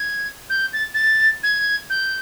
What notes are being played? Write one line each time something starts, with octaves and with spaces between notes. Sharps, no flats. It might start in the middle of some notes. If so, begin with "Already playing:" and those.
Already playing: G#6
G6
A6
A6
G#6
G6